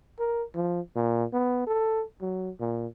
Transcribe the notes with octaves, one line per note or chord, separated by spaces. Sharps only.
A#4
F3
A#2
B3
A4
F#3
A#2